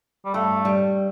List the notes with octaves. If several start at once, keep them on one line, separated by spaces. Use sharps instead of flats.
G3
G2 A3
G3